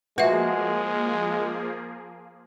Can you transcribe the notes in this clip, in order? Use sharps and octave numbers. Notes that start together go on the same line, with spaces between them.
F3 G#3 A#3 F#4 G#4 B4 E5